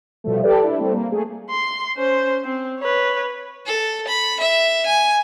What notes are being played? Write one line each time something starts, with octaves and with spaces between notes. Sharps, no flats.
B2 F3 G3 A3
G4 A4 B4 D5
D4 E4
G3 A3 C4
A#3
A3 G#4
C6
C#4 C5
C4
B4 C#5
A4
B5
E5
G#5